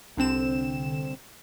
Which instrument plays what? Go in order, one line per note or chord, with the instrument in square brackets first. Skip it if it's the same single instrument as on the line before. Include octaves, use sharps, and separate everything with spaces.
[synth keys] C2 D3 C4 E7